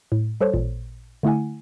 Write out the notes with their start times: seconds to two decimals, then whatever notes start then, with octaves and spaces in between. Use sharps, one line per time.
0.12 A2
0.41 G3 A4 C5 C#5
0.53 A1 A#2
1.23 D3 A3 E4 F#5 G#5